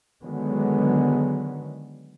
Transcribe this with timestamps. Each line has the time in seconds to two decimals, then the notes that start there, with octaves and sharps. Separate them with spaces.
0.23 D3 D#3 F#3 G#3 B3